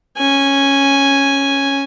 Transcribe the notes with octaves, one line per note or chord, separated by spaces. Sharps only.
C#4 G#5